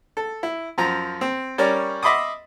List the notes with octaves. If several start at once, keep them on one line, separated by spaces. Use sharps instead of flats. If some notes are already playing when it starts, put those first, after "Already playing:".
A4
E4
F#2 F3 A#5
C4
G3 C#4 A#4 C#5 D5
D#5 E5 B5 C6 D6 D#6